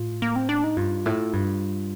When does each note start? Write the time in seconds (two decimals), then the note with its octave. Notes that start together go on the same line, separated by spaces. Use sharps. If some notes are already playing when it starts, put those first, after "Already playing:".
Already playing: A2 F4
0.22 A#3
0.36 C4
0.49 D4
0.64 D#4
0.77 G2 F4
1.06 A2
1.33 G2